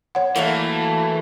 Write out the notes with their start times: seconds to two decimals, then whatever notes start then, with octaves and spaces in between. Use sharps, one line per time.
0.15 C#5 F#5
0.36 E3 F#3 A3 A#3